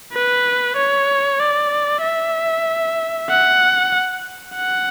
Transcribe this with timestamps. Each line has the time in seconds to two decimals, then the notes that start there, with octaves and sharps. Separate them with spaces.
0.13 B4
0.77 C#5
1.40 D5
2.03 E5
3.30 F#5
4.56 F#5